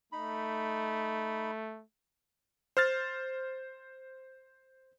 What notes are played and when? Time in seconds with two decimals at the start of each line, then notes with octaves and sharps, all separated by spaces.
0.12 A3 D#4 B5
2.77 C5 F6 A6